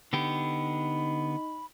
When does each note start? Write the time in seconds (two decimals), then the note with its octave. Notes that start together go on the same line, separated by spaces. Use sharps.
0.13 D3 B3 D#4 G4 B5